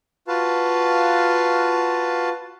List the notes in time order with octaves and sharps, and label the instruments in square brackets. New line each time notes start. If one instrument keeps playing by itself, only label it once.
[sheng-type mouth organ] F4 F#4 B4 F5 A5